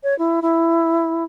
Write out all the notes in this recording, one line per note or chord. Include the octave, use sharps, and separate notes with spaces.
C#5
E4
E4